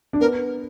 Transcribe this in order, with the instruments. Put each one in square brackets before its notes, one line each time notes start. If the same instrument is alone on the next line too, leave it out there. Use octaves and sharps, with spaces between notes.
[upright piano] D4
[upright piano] B3 [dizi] A#4